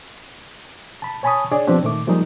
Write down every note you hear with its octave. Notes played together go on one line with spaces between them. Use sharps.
A5 B5
C#5 G#5 A5 B5 C#6 D#6
D4 G#4 C#5 D5
F3 B3 C4 D4 G4
A#2 D#3 A3 D6
F3 G3 G#3 A#3 D#4